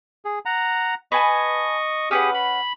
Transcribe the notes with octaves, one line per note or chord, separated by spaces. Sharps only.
G#4
F#5 A#5
B4 D#5 G#5 A5 C#6
C#4 G4 G#4 B4 F#5 D#6
B5